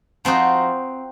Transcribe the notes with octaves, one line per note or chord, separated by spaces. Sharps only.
F3 C4 D#4 F#4